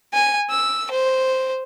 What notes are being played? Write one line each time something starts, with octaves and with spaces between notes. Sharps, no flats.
G#5
E6
C5